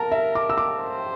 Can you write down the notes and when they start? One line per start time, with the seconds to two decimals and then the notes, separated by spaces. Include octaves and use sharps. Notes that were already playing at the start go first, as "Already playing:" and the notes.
Already playing: A#4 A5 A#5
0.12 E5
0.35 D6
0.50 E6
0.58 D6
0.81 C5